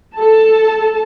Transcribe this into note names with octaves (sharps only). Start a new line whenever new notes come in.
A4 A5